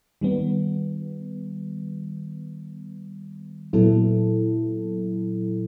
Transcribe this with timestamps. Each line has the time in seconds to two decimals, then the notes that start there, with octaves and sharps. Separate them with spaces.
0.21 D#3 G3 B3
3.73 A#2 F#3 B3 E4 A4